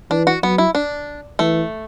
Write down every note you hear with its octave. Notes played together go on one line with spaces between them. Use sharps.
E3 D4
F#4
F#3 B3
E4
D4
E3 A3